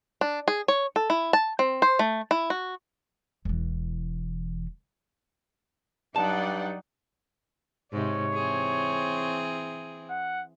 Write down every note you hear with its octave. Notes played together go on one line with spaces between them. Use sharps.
D4
G#4
C#5
A4
E4
A5
C4
C5
A3
E4
F#4
E1 E3
G2 F#3 D#4 D5 F#5 G5 A5
G#2 C3 C#5
E3 C4 G#4
F#5